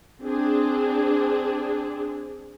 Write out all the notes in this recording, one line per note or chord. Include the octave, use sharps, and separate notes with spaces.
C4 D4 G#4